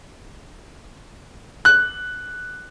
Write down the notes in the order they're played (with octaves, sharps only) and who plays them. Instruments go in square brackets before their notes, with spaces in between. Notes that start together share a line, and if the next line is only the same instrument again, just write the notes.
[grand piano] F#6